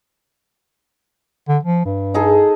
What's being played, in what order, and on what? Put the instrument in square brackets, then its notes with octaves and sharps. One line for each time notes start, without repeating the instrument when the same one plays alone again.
[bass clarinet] D3
F3
G2
[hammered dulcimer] D#4 G#4 A4